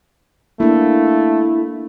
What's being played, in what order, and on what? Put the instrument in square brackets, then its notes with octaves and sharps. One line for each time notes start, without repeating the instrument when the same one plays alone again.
[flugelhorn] A3 [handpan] A#3 D4 [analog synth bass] E4